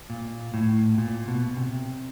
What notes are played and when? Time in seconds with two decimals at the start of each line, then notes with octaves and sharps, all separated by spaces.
0.10 A#2
0.54 A2
0.98 A#2
1.28 B2
1.57 C3